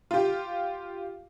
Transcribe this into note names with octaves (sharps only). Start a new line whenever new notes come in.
F4 G4